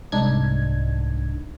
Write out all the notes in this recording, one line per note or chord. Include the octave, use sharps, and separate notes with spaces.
C2 G#2 D4 D#4 G#6